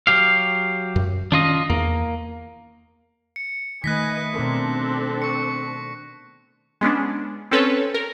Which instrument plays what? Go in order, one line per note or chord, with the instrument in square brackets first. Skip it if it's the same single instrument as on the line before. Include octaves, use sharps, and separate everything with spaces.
[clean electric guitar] F#3 G4 F5
[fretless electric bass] F#2
[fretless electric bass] D#3 C#4 [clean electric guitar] D4 F4 D#5
[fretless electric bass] E2 [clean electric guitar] A#3
[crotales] C#7
[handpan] D#3 A3 [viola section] B4 D#5 G#5 [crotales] F#6 A#6 B6
[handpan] B2 D#4 A#4 [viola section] C4 D4 A4
[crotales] C#6 C#7
[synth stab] G#3 B3 C#4 D4
C4 C#4 A4 B4 C#5
A#4